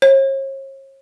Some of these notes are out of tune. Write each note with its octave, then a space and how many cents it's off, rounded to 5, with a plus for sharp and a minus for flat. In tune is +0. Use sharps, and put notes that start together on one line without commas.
C#5 -40